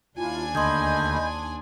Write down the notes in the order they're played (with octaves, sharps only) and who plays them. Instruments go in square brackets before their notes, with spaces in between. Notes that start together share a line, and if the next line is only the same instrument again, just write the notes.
[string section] D#2 D4 G#5 [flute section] E4 F4
[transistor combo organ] D2 [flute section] D#5 B5 G6 [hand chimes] C6 D#6 G#6